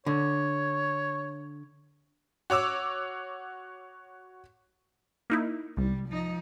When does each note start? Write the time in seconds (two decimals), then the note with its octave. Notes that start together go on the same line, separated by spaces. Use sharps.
0.06 D3 C#5
2.50 F#4 C#5 D6 E6
5.30 A#3 D#4 E4
5.77 C2 G3
6.08 F3 D#4